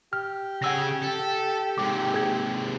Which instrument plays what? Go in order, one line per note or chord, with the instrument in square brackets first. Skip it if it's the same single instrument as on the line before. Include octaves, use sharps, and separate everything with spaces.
[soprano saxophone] G4 [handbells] F6
[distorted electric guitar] C#3 G#5 [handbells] F#5 E6 A#6
[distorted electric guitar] A4
[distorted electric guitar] G#2 C3 [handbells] D6
[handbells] G#4 G#6